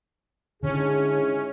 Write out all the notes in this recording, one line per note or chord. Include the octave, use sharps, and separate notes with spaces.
G#2 D3 C#4 E4 G#4